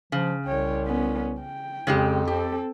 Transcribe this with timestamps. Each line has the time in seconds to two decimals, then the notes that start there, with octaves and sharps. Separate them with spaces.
0.12 C#3 F3
0.45 C2 C#5 G5
0.87 B3 C#4
1.41 G5
1.87 F2 C#3 G#3 G4
2.27 C4 G4 A4